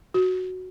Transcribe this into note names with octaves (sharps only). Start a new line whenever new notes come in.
F#4